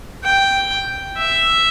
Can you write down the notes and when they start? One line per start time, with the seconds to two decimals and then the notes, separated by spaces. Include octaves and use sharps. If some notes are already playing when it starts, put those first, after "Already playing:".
0.24 G5
1.18 E5